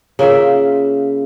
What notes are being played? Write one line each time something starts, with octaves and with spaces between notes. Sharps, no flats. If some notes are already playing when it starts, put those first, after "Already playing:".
C#3 A#3 F4 E5